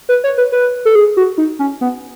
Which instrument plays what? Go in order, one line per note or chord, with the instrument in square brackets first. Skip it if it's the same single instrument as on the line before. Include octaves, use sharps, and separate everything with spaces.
[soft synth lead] B4
C#5
B4
B4
A4
G#4
F#4
D#4
C#4
B3